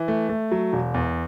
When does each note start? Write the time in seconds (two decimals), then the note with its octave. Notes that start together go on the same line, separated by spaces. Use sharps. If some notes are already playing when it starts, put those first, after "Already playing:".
Already playing: E3
0.08 A3
0.29 A3
0.52 F#3
0.73 E1
0.94 E2